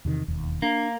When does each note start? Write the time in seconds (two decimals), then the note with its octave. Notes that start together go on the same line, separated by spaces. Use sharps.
0.05 E2 C3 D#3
0.28 E1 D#2
0.62 A#3 D4